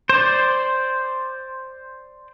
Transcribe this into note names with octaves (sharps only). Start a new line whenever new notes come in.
C5 D5